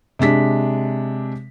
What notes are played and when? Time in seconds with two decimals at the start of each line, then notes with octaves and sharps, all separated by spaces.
0.19 C3 G#3 D4 B6